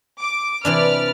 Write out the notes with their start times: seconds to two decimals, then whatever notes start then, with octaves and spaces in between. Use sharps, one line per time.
0.20 D6
0.65 C3 E3 D4 B4 D5 F6